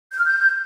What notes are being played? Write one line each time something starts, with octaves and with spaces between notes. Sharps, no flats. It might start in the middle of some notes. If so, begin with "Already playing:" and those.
G6
F6
G6